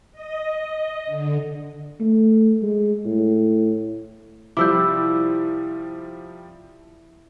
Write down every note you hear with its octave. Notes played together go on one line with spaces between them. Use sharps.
D#5
D3
A3
G#3
A2
C3 F3 G3 E4 D6 E6 G6